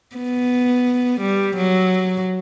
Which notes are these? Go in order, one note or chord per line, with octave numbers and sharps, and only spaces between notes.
B3
G3
F#3